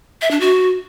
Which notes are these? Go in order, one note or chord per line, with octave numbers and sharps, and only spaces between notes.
E5
D4
F#4